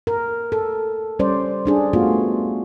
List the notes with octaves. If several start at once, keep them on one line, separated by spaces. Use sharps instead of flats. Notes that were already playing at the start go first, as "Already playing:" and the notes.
A#4
A4
G3 C#4 C5 D5
G3 D4 G#4
A3 B3 F4 F#4